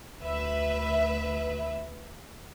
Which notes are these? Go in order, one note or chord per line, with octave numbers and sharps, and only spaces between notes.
D2 B4 E5